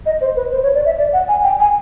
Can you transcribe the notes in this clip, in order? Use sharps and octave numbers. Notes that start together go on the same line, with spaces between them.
D#5
C5
B4
C5
C#5
D5
E5
D5
F#5
G#5
G5
G#5